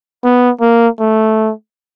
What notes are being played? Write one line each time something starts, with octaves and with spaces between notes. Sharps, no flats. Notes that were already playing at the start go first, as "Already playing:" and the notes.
B3
A#3
A3